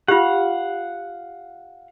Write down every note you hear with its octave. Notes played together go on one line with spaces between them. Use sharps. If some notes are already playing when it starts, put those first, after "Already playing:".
F4 G4 F5 F#5